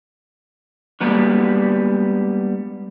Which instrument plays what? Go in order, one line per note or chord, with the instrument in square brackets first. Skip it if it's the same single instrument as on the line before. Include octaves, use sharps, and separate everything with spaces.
[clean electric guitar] G3 G#3 A#3 B3 D4